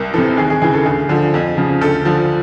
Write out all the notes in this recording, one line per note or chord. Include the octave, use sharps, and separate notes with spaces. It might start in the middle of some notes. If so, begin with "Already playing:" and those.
Already playing: C2 A#4
C3 E3 A4
D#2 G#4
G#4
C#3 E3 G#4
A4
D2 G#4
D3 F3
F2
C#3 F3
D2 A4
D3 F3